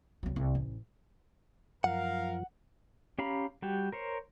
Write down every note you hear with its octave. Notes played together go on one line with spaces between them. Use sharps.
C2 F#3
C2
A1
F#2 F3 A#4 F5 F#5
C#4 G4 F5 A#5 B5
G3 F#4 G4
A#4 C5 C#5